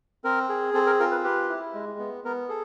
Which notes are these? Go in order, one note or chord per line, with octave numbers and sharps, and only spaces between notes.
C4 A#4
G#4
C4 A4
A#4
F4 A#4
B4
G4 B4
E4
G#3
B3
B3 A#4
G#4 A4